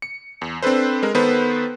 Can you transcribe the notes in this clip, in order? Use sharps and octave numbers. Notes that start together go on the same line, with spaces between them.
C#7
E2
C4 D4 A4 B4 C5
G#3 A#4
D#3 B3 A4 B4 C5